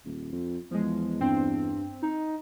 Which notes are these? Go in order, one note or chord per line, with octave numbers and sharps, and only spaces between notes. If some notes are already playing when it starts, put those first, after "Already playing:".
D#1
F2
E2 F3 G#3
G2 C4
D#4